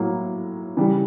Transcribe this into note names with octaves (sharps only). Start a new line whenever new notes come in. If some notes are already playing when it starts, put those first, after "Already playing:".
Already playing: A2 F#3 A#3
C#3 E3 G3